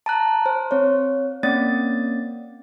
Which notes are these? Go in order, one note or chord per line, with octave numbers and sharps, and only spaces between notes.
A5 A#5 F#6
C5
C4 C#5
A#3 C4 C#4 D5 A6